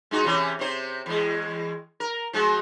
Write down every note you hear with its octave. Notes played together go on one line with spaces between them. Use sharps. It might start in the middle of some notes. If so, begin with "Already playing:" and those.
G#3 D#4 F#4
C3 E3 C#4
C3 C4 C5
E2 G#3
A#4
F3 G#3 F#4